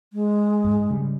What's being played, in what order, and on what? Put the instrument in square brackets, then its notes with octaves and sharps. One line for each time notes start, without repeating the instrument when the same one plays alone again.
[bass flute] G#3
[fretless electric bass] G#2
C#3 G3